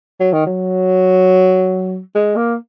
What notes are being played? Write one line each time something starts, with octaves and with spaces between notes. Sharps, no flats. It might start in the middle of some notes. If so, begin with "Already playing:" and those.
F#3
D#3
F#3
G#3
A#3